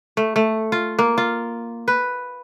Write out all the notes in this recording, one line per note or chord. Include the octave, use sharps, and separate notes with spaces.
A3
A3
F4
A#3
F4
B4